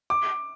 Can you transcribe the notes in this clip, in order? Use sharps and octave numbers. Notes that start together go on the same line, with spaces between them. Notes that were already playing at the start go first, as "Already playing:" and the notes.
D6